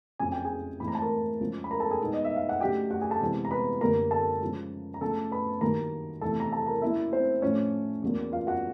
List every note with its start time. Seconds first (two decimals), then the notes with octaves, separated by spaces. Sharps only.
0.19 F2 C#3 F#3 G#5
0.32 G5
0.44 G#4 G#5
0.80 G#2 E3 A3 C4 B5
0.88 A#5
0.95 A5
1.02 A#4 A#5
1.40 C#3 F3 G#3
1.64 B5
1.71 A#4 A#5
1.80 A4 A5
1.91 G#4 G#5
2.01 B2 G#3 B3 D#4
2.13 D#5
2.25 E5
2.36 F5
2.49 F#5
2.60 C#3 F#3 A3 D4 G4 G5
2.91 F#4 F#5
3.01 G#4 G#5
3.10 A4 A5
3.21 C3 E3 G#3 B3
3.45 A#5
3.51 B4 B5
3.81 F#2 D3 G3 A#3 A#4 A#5
4.11 A4 A5
4.41 C#3 F3 G#3
4.94 A#5
5.01 C#3 F3 A3 A4 A5
5.31 B4 B5
5.61 G2 D#3 F#3 A#3 D#4 A#4 A#5
6.21 E2 C3 E3 A3 A4 A5
6.40 A#5
6.52 A4 A5
6.67 A#4 A#5
6.82 C#3 F#3 A#3 D4 E4 E5
7.12 C4 C5
7.42 A2 F3 A3 C#4 D4 C#5
8.02 E2 C#3 F#3 A#3
8.32 F4 F5
8.47 F#4 F#5